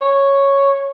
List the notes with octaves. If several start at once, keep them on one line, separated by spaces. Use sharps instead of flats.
C#5